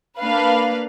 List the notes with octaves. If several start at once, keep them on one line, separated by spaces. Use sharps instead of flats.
A#3 D4 B4 F5